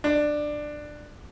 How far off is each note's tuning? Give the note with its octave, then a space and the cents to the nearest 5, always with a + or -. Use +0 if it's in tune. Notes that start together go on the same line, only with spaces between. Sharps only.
D4 +15